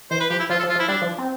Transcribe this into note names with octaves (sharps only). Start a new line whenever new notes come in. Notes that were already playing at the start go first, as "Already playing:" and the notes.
E3 C5
B4
F3 G4
E4
F3 F4
A4
F3
F4
F3
E4
G3 D4
F3
C4